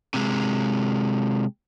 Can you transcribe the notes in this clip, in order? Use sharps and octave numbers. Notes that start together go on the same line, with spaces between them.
C3 G#3